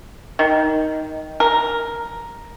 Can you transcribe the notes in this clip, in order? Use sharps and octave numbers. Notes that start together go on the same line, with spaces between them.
D#3
A#4